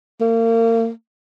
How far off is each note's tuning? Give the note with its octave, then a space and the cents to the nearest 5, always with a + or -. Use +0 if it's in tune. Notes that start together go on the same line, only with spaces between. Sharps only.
A#3 -35